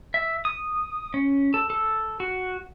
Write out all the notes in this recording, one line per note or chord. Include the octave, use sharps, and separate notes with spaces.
E5
D#6
C#4
A4
A4
F#4